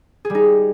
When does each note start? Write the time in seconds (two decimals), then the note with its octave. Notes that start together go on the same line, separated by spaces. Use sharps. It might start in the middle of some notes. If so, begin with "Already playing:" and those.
0.25 G#4
0.30 G3
0.35 D#4